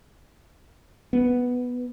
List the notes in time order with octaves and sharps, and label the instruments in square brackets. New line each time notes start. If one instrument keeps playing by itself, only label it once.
[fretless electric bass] B3